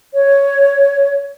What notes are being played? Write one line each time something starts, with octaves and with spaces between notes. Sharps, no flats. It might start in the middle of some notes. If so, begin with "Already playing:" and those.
C#5